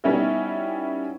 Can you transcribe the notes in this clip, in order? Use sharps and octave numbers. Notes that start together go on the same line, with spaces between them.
G3 B3 C#4 D#4 E4 F#4